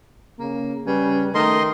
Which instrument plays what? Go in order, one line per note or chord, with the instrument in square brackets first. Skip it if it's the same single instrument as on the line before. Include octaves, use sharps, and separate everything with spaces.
[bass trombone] C#3 [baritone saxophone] A#3
[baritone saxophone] C#3 [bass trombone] G3 [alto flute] B4
[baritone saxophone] D#3 [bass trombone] A3 [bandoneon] D#5 C6 [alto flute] A#5